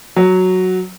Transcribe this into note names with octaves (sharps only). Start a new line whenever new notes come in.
F#3